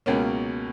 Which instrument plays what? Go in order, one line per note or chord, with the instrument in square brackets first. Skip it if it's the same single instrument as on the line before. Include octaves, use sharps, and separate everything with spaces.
[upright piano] C#2 B2 A#3 C#4